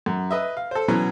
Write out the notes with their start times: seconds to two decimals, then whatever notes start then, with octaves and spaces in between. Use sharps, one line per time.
0.06 F#2
0.31 B4 D#5 E5
0.57 F5
0.71 A4 C5
0.88 B2 E3 F#3 C#4